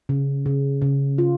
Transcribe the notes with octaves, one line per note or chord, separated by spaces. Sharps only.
C#3
C#3
C#3
F4